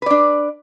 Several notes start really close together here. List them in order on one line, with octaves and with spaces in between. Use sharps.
B4 D5 D4